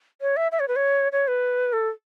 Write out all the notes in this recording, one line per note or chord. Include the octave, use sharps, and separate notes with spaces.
C#5
E5
E5
C#5
B4
C#5
C#5
B4
A4